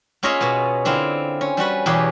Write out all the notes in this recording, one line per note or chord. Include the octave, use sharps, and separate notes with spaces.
A#3 C#4 F4 G#4 D#5 E5
B2 B3
D3 C4 E4 F4
C#4
G3 C#4 F#4 B4
E2 B2 A#3 G4 G#4 B4